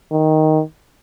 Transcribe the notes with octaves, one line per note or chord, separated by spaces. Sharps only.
D#3